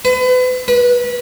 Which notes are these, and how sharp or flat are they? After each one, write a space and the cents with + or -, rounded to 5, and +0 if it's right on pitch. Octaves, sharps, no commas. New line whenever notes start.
B4 +35
B4 -25